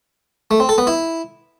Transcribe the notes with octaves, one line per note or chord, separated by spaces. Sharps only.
A3
C4
A4
B3
E4